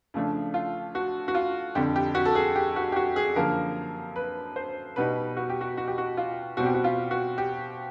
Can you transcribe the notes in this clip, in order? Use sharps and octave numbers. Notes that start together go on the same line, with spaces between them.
C#3 F3 A3 D4
F4
F#4
F#4
F4
F2 D3 G3 G4
G4
F#4
A4
G#4
G4
F#4
G4
F#4
G#4
F#2 D3 F3 A#3 A#4
B4
C5
B2 G3 B3 D#4 B4
F#4
G4
F#4
F#4
G4
F#4
F4
B2 G3 C4 F#4
G4
F#4
F4
F#4
G4